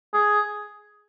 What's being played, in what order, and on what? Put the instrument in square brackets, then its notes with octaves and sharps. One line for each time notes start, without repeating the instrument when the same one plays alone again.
[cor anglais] G#4